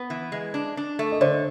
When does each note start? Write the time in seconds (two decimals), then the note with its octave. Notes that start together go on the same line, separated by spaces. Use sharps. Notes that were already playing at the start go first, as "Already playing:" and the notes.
Already playing: B3
0.10 E3
0.32 G#3
0.54 D4
0.77 D4
0.99 A3
1.12 D#5
1.21 D3 C5 D5